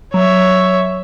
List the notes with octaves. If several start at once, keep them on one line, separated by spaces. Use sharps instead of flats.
F#3 C#5 E5